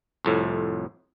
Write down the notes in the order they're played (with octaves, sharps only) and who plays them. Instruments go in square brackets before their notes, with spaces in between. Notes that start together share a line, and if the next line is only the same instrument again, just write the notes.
[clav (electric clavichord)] C2 F2 A2